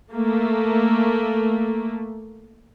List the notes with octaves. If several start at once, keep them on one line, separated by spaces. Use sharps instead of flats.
A3 A#3